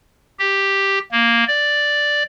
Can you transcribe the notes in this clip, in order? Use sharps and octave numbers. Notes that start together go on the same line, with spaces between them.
G4
A#3
D5